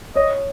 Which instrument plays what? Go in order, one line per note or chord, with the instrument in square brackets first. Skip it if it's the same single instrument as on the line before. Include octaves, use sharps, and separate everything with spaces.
[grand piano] C#5 [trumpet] D#5